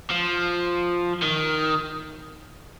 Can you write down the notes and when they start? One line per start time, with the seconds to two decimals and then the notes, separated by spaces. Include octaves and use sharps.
0.10 F3
1.23 D#3